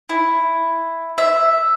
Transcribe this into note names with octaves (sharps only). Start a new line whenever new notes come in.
E4
E5